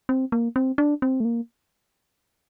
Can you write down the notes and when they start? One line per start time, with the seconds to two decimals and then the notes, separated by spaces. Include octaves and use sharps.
0.09 C4
0.32 A#3
0.56 C4
0.78 D4
1.02 C4
1.20 A3
1.25 A#3